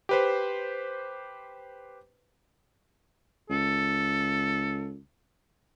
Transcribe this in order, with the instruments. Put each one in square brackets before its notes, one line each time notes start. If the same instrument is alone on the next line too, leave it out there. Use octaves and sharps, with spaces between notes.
[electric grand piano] G4 B4 C5
[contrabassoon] C#2 [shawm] A4